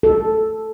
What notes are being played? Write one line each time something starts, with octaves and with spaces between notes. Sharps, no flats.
A4